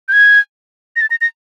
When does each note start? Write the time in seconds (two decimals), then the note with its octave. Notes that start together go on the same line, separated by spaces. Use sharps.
0.08 G6
0.12 G#6
0.96 A#6
1.01 A6
1.10 A#6
1.21 A#6